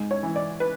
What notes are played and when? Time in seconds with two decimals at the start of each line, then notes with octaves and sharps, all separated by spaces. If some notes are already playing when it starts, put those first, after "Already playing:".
Already playing: G#2
0.11 C#5
0.23 E3
0.36 D5
0.60 B4